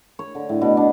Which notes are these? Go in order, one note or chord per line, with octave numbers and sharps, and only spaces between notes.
C#5
D3
A2
B2
D4